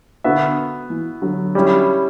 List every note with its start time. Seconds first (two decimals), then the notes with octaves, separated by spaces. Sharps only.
0.24 D3 B3 F#4 B4 E5
0.90 E3
1.22 D3 F#3
1.55 G3 C#4 E4